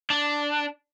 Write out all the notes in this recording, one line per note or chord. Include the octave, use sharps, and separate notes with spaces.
D4